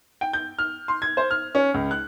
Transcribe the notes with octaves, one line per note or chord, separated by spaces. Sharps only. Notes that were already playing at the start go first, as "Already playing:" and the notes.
G5
G6
F6
C6
G#6
C5
F6
C#4
C#2
F#6